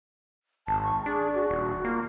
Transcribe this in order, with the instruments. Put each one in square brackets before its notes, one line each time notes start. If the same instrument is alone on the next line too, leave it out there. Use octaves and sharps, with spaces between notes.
[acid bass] G#1 [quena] A5
[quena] C#6
[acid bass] D4 [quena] G#4
[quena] F#4
[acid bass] D#1
[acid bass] A#3 [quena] F4